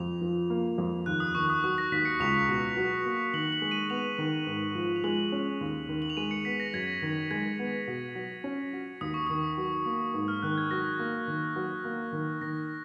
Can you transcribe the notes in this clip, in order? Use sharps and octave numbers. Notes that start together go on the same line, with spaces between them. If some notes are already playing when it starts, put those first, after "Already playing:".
Already playing: F2 F7
F3
A#3
F2
D#2 F#6
D#6
D#3 C#6
D#6
F#3 C#6
A#6
D#2 B6
C#7
C#2 F7
B2
F#3
A#3
D#3 F#7
F#7
G#3
D#7
B3 F7
D#3
G#2
F3
F7
G#3 F#7
C#4
D#2
D#3
F#7
F7
G#3 D#7
C#7
B3 B6
A#6
F#2 G#6
D#3
G#3 G#6
B3
B2
F#3
C#4
F#4
D#2 D#6
C#6
D#3 D#6
F#3
A#3
G#2
F6
D#3 F#6
G#6
F#3 A#6
A#3
D#3
F#3
A#3
D#3
D#3 A#6